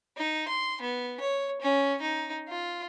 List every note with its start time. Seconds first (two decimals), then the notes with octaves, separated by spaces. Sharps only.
0.17 D#4
0.48 C6
0.81 B3
1.20 C#5
1.61 C#4
2.01 D#4
2.48 F4